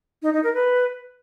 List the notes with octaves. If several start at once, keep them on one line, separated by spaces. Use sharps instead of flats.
D#4
D#4
A#4
B4